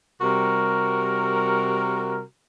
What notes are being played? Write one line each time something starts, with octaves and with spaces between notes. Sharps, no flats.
C3 G3 F#4 A#4